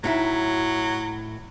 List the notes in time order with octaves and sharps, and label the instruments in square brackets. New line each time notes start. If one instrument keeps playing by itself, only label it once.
[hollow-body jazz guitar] A2 D#4 E4 [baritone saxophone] F#3